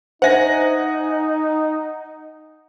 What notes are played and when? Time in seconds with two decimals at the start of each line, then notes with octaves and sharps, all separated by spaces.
0.22 D#4 C5 E5 F#5 G#5 A#6